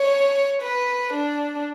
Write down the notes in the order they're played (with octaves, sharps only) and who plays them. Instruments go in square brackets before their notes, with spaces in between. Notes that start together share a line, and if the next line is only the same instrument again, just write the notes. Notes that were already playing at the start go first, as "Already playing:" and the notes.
Already playing: [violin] C#5
B4
D4